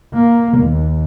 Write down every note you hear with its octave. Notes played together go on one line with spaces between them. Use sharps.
A#3
D#2